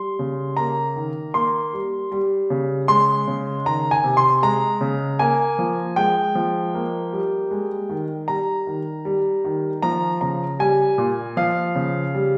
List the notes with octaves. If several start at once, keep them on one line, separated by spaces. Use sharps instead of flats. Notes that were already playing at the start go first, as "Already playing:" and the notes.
Already playing: G3 C6
C#3
A#3 A#5
D#3
A#3 C6
G3
G3
C#3
G#3 C6
C#3
D#3 A#5
G#5
C3
C6
G#3 A#5
C#3
A#3 G#5
F3
G#3 G5
F3
A#3
G3
G#3
D#3
G3 A#5
D#3
G3
D#3
F3 A#5
C#3 A#5
G3 G#5
A#2
F3 F5
C#3
G3